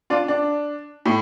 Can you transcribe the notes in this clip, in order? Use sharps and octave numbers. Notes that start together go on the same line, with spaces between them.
D4 F4
D4
A2